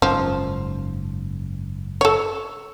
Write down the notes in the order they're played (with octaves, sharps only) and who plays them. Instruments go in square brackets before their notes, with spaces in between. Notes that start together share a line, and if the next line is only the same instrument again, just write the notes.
[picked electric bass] F#1 G#2 C#4 [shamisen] F3
[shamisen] A4 C#5